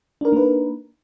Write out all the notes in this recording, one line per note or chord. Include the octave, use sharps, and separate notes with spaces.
A#3 D4 D#4 A#4 B4